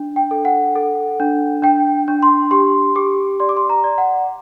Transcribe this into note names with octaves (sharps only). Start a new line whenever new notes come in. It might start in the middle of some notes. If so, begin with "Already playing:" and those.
Already playing: D4
G5
A4
F#5
A4
D4
D4 G5
D4
C6
G4 C6
G4 D6
D5 C6
D6
C6
A#5
D5
F#5